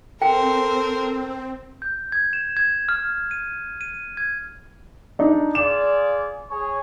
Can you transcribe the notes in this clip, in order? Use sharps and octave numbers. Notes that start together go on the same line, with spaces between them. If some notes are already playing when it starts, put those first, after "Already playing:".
C4 A4 A#4 C5 G5
G6
G#6
E7
G#6
F6
D#7
D#7
G#6
D4 D#4
F4 G#4 D5 E7
G#4 C#5